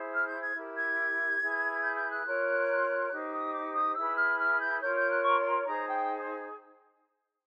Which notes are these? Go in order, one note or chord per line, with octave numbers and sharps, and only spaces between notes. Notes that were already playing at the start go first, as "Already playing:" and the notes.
Already playing: E4 G#4 C5
F6
G6
G#6
E4 G4 A#4
G#6
E4 G#4 B4
G6
G6
F#6
F4 A#4 C#5
D#4 G4 C5
D#6
D6
D#6
E4 G#4 B4 E6
F6
F6
G6
F4 A#4 C#5 G6
G6
F#6
C#6
C6
D#4 G#4 C5 A#5
G5